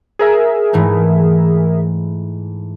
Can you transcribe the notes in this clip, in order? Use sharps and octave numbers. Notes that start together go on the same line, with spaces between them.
G#4 A#4 E5
G#2 E3 A3